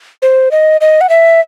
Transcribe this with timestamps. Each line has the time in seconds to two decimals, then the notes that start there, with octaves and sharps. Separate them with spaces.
0.22 C5
0.51 D#5
0.81 D#5
1.01 F#5
1.09 E5